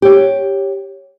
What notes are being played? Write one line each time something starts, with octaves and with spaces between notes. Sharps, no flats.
G4 C#5